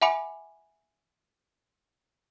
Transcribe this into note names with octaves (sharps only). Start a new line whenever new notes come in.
E5 F#5 G#5 B5 D6 C#7